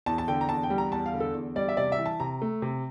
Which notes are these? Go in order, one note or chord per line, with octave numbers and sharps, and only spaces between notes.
E2 A5
A5
D3 G5
A#5
E2 A5
G5
G3
A#5
E2 A5
F5
D3
A4
E2
G3 D5
E5
C3 D5
E5
E3
A5
C3 A#5
A3
C3